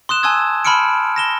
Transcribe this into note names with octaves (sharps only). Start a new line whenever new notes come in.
C6 D#6 F#6 E7
G#5 A5 C6 D#6 E6 G#6
A5 B5 C6 F6 C#7 D7
A#6 E7 G7